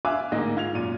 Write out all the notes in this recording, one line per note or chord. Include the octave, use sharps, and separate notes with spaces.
E5 F5 G#5 D6 E6 F#6
A1 D2 G#2 A#3 D#5
G#2 F4 G#6 F7
F#2 A#2 D#7